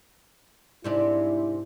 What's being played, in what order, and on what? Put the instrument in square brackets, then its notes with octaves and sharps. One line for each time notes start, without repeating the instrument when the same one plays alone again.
[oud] G#2 C3 D4 [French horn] E4